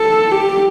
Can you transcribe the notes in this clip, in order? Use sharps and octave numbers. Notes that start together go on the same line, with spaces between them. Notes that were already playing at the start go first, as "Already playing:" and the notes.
Already playing: A4
G4